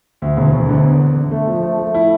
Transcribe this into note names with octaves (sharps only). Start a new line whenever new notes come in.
D2
E1
D2
D3
E2
E2
D3
A3
F3
A3
A3
E4